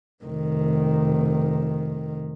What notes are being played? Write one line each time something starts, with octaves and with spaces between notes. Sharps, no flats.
F1 D#3